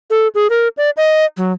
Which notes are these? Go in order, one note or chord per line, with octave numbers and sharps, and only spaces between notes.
A4
G#4
A#4
D5
D#5
F#3